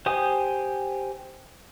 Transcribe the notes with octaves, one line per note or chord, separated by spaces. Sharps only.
G4 C5 G#5 D#6